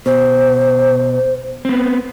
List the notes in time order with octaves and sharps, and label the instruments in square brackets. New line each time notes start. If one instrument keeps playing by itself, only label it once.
[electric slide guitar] B2 [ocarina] C5
[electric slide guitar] B3 C4